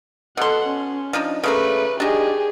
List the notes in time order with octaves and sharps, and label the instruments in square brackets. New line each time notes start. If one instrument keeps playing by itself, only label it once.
[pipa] B2 C6 [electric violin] A4 F#5
[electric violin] C#4
[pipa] F3 D4 D#4
[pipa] C#3 A3 A#3 [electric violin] B4
[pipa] D4 D#4 [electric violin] G4 G#4